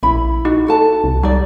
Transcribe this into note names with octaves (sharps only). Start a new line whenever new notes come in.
A#1 E4 B5
D#4 F#4
F#4 A4 A5
C2
G3 D#4 D5